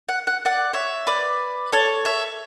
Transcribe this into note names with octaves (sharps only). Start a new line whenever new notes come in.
F#5
F#5
D5 F#5
C#5 E5
B4 D5
A4 C#5
C#5 E5